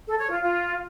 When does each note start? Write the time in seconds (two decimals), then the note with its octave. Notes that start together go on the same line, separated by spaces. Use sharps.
0.07 A4
0.19 C#5
0.30 F4
0.42 F4